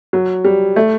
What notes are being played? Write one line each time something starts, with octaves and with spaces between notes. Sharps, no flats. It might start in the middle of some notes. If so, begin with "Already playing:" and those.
F#3
G3
A3